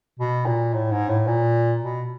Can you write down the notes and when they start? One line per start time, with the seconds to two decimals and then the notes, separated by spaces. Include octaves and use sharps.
0.20 B2
0.46 A#2
0.74 A2
0.91 G#2
1.09 A2
1.27 A#2
1.81 B2